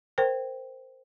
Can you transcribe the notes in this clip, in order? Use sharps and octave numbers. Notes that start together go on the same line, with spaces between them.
A#4 C5 G5